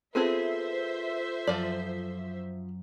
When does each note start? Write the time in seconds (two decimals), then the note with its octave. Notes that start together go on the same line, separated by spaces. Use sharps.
0.15 B3 C4 F4 G#4 A4 C5 E5
1.47 F#2 F3 D5